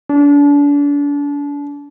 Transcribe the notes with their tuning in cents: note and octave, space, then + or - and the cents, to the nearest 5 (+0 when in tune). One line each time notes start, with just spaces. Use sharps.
D4 -35